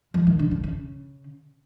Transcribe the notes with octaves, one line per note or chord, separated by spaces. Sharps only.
F3
D#3
D3
C#3
C#3